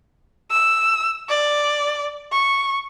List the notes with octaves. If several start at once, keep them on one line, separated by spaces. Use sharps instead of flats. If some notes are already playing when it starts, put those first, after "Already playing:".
E6
D5
C#6